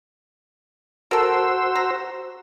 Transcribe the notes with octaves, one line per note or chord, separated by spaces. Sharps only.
F#4 A4 A#4 C5 E6
A#5